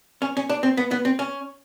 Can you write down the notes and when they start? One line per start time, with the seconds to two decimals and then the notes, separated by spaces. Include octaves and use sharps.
0.22 C#4
0.37 C#4
0.49 D4
0.63 C4
0.77 B3
0.91 B3
1.05 C4
1.19 C#4